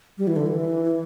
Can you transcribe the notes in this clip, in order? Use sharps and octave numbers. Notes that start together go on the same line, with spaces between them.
G3
E3
D3
E3